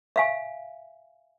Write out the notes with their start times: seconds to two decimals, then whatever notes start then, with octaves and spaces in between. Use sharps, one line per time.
0.16 E5 F5 G#5